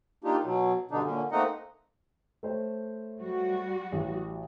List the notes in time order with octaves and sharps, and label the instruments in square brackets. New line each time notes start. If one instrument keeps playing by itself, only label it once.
[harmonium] A#3 D4 D#4 F4 G4
B2 F#3
G2 B2 D3 D4 D#4
A#2 D3 C#4
A3 A#3 C4 D#4 D#5 F#5
[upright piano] A3 C5 C#5
[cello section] G3 F#4
[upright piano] A1 G4